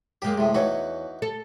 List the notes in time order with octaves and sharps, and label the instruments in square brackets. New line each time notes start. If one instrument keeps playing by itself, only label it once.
[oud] F#2 G#3 [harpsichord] A#3 G4
[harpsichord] A2 C3
[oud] E2 C#5 [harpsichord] E3 D#4 F#4
[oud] A4